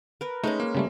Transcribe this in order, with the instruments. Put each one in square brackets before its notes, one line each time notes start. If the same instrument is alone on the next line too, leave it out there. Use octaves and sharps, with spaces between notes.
[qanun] A#4 B4
[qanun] G#3 C#4 [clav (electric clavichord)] A3 [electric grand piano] D#4
[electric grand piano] A#3
[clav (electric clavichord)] C#3 G3 A3